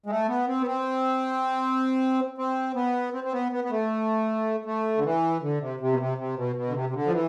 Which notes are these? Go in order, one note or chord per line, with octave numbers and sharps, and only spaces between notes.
G#3
A3
B3
C4
B3
C4
C4
B3
C4
C4
B3
B3
B3
A3
A3
D3
E3
D3
C3
C3
B2
C3
C3
B2
B2
D3
C3
C3
D3
F3
E3